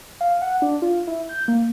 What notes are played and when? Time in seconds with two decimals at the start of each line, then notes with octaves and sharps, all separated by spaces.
0.21 F5
0.42 F#5
0.62 D4
0.82 F4
1.07 E4
1.29 G6
1.48 A#3